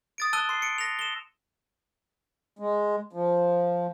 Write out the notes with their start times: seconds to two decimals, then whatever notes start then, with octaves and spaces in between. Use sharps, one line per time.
0.18 D#6 A6 D7
0.33 A5 E6 F#6 D#7 G7
0.49 C6 C7
0.62 C#7 D7
0.78 A#6 F7
0.99 E7 G7
2.59 G#3
3.13 F3